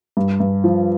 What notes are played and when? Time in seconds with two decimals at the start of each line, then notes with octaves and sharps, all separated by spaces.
0.17 G2
0.40 G2
0.64 F3